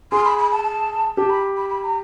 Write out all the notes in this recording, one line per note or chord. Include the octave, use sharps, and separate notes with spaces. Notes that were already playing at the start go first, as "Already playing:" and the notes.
G#4 C6
B5
B5
A5
A5
G4 A5
B5
B5
B5
A#5